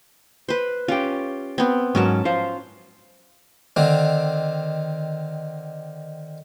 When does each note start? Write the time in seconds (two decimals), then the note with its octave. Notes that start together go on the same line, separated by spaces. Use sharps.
0.49 B4 C5
0.88 C#4 F4 G4
1.58 B3 C4
1.95 G#2 F#3 C#4 A#4 A5
2.25 F4 C5 F5
3.76 D3 D#3 C4